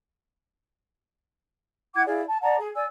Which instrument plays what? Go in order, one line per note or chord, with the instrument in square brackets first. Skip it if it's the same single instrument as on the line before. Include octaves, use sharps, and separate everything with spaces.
[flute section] E4 F#5 D6 G#6
E4 G#4 D5 F5
A5
D5 F#5 A5 A#5
G#4
D5 G#5 E6